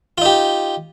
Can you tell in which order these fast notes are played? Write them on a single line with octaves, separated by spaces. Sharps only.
F4 D#4 G4